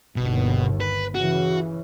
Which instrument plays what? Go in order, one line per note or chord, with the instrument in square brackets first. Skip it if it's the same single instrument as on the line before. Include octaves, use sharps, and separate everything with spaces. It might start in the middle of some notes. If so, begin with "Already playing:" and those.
[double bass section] G1 D#2 [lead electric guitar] B2
[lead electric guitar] B4
[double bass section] C#3 E3 [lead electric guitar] F#4